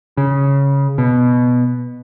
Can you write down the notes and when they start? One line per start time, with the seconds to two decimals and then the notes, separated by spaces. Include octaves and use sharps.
0.17 C#3
0.98 B2